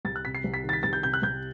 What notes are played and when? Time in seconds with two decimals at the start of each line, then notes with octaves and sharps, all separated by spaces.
0.05 C2 A6
0.16 F#6
0.25 C3 B6
0.35 C7
0.44 C2
0.54 B6
0.64 D#3
0.69 A6
0.73 B6
0.83 C2 A6
0.93 G6
1.03 C3 G6
1.14 F#6
1.23 C2 G6